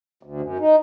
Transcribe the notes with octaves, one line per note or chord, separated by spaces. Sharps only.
D2
F#2
D#4